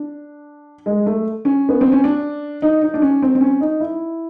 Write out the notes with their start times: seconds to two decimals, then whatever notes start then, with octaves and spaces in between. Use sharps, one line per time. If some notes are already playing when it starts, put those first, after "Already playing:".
Already playing: D4
0.86 G#3
1.06 A3
1.45 C#4
1.69 B3
1.81 C4
1.92 C#4
2.04 D4
2.62 D#4
2.82 D#4
2.94 D4
3.02 C#4
3.22 C4
3.35 C4
3.41 C#4
3.61 D#4
3.80 E4